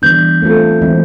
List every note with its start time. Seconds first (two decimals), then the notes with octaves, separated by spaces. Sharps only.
0.02 E3 G3 B3 D4 G6
0.42 A3 C4 F4 A4
0.81 E3 G#3 C4 E4